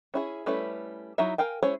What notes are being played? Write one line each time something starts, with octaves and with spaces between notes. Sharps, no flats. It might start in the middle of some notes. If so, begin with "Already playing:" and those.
C#4 E4 G#4
G3 A3 C#4 E4 B4
F#3 D#4 E4 E5
A#4 F5 G5 G#5
G#3 C#4 E4 C5 C#5